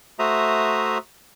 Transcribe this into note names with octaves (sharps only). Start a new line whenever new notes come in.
A3 F#4 C5 E5 A#5 D#6